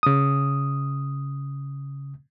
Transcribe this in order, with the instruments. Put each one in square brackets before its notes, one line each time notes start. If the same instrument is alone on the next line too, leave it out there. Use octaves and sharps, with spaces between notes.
[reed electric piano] C#3 D#6